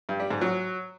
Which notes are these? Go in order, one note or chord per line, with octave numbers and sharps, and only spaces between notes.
G2
G3
G#2
F#3